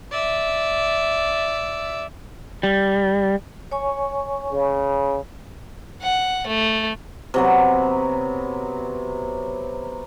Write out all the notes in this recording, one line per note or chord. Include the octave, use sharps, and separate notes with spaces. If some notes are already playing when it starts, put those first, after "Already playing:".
D5 E5
G3
C#5 G#5 C#6
C#3
F#5
A3
C3 F#3 B3